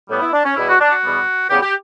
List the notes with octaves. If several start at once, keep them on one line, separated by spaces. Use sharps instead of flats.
A2 G3 B3
E4
D4
C#4
E2 B2 G3 B3 E4
F#4
D4
F#4
E2 B2 G3 B3
E2 C#3 G3 B3 G4
G4